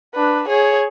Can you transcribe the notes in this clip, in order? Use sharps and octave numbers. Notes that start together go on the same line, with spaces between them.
D4 B4
G#4 C#5